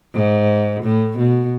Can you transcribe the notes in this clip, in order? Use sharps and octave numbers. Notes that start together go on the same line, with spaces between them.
G#2
A2
B2